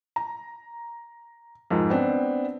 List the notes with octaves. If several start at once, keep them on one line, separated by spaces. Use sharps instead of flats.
A#5
F2 G#2 A#4
B3 C4 D4